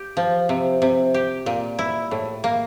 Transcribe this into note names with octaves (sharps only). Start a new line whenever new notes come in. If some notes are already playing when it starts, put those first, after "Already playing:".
Already playing: G4
F3
C3
C3
G4
A#2
E4
A2
A#3